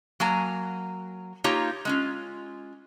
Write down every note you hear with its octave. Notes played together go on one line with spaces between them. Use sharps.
F#3 A#3 G#5 A#5
A#3 D#4 F4 G4 C#5 A#5
G#3 C#4 F4